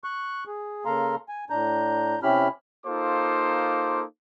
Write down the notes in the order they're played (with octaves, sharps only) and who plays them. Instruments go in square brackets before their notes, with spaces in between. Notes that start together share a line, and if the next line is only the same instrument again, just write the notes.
[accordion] C#6 F#6
G#4
C#3 A#3 A4 F5 A#5 C6
G#5
A2 D4 A#5 G6
C3 C#4 E4 G4 B5 F6
[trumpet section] A#3 D#4 F4 A4 C5 D6